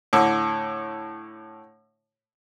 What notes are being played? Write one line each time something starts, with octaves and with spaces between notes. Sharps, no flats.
A2 D3